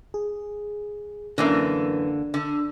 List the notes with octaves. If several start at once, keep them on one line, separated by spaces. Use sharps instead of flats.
G#4
F#2 D3 E3 A#3 D4
D3